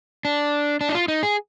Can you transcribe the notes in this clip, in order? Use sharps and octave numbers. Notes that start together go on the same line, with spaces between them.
D4
D4
D#4
F4
D#4
G#4